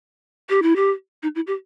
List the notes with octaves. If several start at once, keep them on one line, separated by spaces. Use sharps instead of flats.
G4
E4
G4
D#4
E4
G4